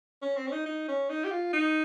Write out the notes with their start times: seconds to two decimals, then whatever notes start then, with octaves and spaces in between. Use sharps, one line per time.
0.22 C#4
0.37 C4
0.47 C#4
0.52 D#4
0.66 D#4
0.88 C#4
1.10 D#4
1.24 G4
1.31 F4
1.53 D#4